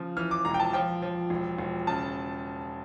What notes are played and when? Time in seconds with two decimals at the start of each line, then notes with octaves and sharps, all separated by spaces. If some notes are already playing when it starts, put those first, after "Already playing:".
Already playing: C#3 F3
0.17 E3 F6
0.31 D6
0.45 E1 A#5
0.54 G5
0.60 A5
0.73 F3 G5
1.02 F3
1.30 E1
1.58 E1
1.87 C#3 A5